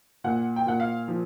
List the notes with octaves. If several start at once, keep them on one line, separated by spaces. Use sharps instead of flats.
A#2 F#5
G5
A#2 F#5
F5
F3